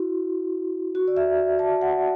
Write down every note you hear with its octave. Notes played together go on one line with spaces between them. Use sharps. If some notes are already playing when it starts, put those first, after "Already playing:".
Already playing: E4 F#4
F#4
D5
E5
A5
F#5